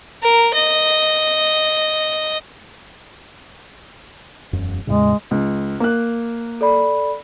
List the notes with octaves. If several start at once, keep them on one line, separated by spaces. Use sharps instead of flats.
A#4
D#5
E1 F#2
E2 A2 C#3 G#3
C#2
A#3 F#6
A4 D5 B5